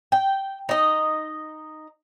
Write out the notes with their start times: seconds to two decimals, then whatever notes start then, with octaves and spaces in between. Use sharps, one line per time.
0.12 G5
0.69 D#4 D#5